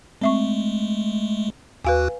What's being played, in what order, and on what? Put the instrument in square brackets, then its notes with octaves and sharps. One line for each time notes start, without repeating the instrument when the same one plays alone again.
[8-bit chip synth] G#3 A3 [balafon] C4 E5 C#6
[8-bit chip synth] D#2 F#4 F#6 [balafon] B4 F5 G#5